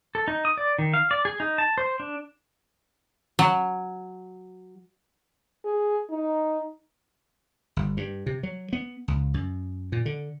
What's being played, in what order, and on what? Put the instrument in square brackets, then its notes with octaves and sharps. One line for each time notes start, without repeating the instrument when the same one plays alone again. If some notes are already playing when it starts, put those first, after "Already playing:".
[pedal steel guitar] A4
D#4
D#6
D5
D#3
F5
D5
G#4
D#4
A5
C5
D4
[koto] F#3
[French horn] G#4
D#4
[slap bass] G1
G2
C3
F#3
B3
C#2
F#2
A#2
D3